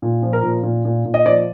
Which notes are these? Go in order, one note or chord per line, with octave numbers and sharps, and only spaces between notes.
A#2
F3
A#4
A#2
A#2
A#2
A#2
D#5
F3 D5